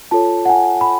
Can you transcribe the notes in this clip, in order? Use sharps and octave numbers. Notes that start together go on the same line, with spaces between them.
F4 A4 C#5 A5
F#5
G#5
B5